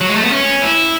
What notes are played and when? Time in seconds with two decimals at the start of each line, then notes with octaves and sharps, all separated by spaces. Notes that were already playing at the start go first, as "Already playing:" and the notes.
0.01 F#3
0.09 G#3
0.16 A3
0.23 B3
0.32 C#4
0.62 E4